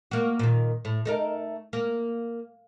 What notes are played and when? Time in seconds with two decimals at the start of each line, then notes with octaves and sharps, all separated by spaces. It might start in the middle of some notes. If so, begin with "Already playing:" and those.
0.11 A#3 F#4
0.39 A#2 D#3
0.85 A2
1.05 A3 D#4 A#4
1.73 A#3